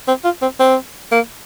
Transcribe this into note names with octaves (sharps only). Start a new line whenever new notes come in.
C4
F4
C4
C4
A#3